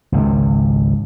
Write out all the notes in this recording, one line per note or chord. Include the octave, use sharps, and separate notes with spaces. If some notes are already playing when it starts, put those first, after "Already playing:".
G#1 C#2